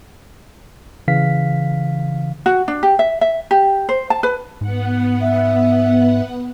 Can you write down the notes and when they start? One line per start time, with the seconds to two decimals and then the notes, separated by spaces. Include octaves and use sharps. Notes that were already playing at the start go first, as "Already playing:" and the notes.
1.08 C#3 E3 F5 B6
2.46 F#4
2.68 D4
2.83 G4
2.99 E5
3.21 E5
3.51 G4
3.89 C5
4.10 A5
4.23 B4
4.61 G#2 B3 F#5
5.21 E5